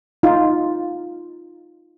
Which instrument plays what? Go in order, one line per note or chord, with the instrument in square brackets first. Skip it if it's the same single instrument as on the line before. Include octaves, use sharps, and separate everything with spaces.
[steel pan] D#4 F4